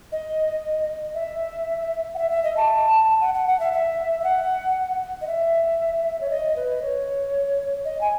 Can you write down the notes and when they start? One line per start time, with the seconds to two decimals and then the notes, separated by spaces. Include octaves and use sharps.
0.12 D#5
1.15 E5
2.14 F#5
2.18 E5
2.31 E5
2.44 D#5
2.57 A5
3.21 F#5
3.34 F#5
3.47 F#5
3.60 E5
3.73 E5
4.20 E5
4.24 F#5
5.21 D#5
5.27 E5
6.21 C#5
6.30 D#5
6.56 B4
6.82 C#5
7.85 D#5
8.01 G#5